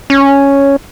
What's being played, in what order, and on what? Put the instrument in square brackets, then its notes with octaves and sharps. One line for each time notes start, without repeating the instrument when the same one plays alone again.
[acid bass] C#4